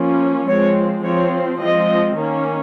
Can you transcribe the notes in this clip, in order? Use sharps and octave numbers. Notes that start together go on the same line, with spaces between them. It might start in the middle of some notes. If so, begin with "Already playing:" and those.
Already playing: F3 A#3 C#4
F3 G#3 C4 C#5
F3 C4 C#5
F3 G#3 C4 D#5
D#3 A#3 C#4